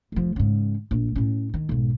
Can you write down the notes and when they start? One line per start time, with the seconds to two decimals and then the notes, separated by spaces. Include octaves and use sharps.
0.12 F1 F3
0.36 G#2 C#3
0.91 A#1
1.16 A2 C#4
1.54 D#3
1.69 B1 G#2